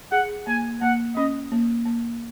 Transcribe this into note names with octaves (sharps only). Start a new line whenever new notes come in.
G#4 F#5
A#3 G#5
A#3 F#5
C#4 D#5
A#3
A#3